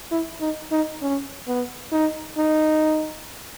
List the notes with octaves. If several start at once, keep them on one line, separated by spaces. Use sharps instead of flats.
E4
D#4
D#4
C#4
B3
D#4
D#4